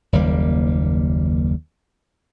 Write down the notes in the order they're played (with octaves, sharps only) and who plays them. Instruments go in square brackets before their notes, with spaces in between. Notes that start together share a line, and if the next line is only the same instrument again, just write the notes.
[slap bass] F#1 D#2 G3 A#3